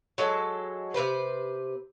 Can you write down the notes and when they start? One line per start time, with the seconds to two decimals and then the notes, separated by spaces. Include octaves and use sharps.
0.18 F#3 G#3 A4
0.94 C3 G#3 B4 C5